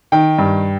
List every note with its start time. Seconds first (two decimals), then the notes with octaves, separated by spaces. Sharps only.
0.12 D#3 G5
0.38 G2